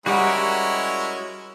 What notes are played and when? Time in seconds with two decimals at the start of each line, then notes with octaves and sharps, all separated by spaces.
0.06 G3 G#3 C#4 E4 F#4 G4 A#4 F#5